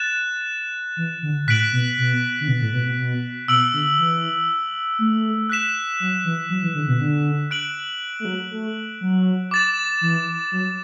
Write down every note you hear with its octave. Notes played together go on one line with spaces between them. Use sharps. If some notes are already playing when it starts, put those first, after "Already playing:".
Already playing: F#6 A6 E7
E3
D3
A2 F#6 B6 D7 F#7
B2
B2
D3
B2
A2
B2
B2
B2
B2 E6 D7 F#7
D3
E3
A3
F#6 B6 E7
F#3
E3
F#3
E3
D3
B2
D3
F#6 D7 F#7
A3
F#3
A3
F#3
D6 A6 E7
E3
F#3